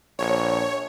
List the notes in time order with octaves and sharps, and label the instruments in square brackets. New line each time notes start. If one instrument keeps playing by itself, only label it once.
[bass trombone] A#1 [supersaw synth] C#5